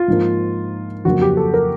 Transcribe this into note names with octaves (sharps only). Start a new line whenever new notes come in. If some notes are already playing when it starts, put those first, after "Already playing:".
Already playing: F4
G#2 F3 A#3
F2 C#3 F#3 A#3 F#4
G4
A4
A#4